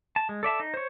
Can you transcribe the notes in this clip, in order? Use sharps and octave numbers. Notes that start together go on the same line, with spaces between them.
A5
G#3
A4 D5 E5 A5
D#4
C5 C#5